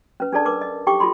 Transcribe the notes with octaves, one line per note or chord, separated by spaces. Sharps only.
C#4 B4
D4 G#4 A4 D5 A5
A#4 B4 D6
D#5
D#4 G4 A4 G5 C#6 D6
F4 A4 B5 C6